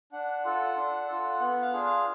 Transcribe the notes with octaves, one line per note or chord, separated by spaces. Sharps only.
D4 F#5
F4 A4
D4
F4 A4
B3 F#5
F5
D4 F4 G#4
F5